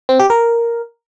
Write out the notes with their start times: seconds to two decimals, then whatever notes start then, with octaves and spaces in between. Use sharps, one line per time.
0.09 C4
0.19 G4
0.30 A#4